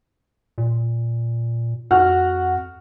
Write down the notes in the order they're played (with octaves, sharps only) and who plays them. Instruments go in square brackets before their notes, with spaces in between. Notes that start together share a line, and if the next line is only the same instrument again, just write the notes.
[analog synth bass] A#2
[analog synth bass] F2 [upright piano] F#4 F#5 F6